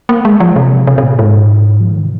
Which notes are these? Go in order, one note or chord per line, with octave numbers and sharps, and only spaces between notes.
A#3
G#3
F3
C3
C3
C3
A#2
G#2
F3
D#3
C3